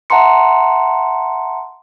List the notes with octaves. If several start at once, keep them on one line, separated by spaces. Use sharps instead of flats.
E5 F#5 A5 A#5 C6 C#7